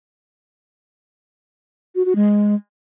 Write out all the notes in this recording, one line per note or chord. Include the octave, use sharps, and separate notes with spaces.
F#4
F#4
G#3